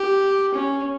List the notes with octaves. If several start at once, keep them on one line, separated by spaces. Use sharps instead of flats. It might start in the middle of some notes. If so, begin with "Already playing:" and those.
Already playing: G4
C#4